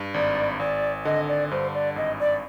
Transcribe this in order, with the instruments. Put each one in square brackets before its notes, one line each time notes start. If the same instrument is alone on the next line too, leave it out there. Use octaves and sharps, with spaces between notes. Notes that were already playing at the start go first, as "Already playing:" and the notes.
Already playing: [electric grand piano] G2
[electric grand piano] G#1 [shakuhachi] D5
[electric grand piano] G#1 [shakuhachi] D5
[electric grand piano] D3 [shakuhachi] D#5
[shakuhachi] D5
[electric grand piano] G2 [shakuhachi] C5
[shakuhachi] D5
[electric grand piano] G#1 [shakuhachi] D#5
[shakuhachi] D5